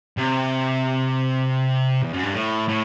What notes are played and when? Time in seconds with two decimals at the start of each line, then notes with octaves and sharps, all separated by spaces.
0.18 C3
2.03 E2
2.14 F#2
2.24 G2
2.34 A2
2.69 A2